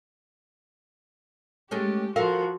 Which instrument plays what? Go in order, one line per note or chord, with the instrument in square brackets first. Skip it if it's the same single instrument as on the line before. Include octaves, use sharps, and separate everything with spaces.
[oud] G#3 A3 C#4 [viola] G4
[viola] F3 F#4 [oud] A4 A#4 F5